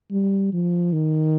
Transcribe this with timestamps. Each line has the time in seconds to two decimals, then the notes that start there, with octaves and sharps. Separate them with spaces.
0.11 G3
0.53 F3
0.93 D#3